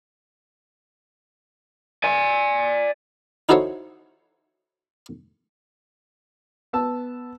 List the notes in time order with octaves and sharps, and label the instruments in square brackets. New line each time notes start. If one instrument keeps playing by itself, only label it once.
[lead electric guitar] D5 G#5
[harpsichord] D#4 E4 F#4 A4 C5 C#5
[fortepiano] B3 A5 E6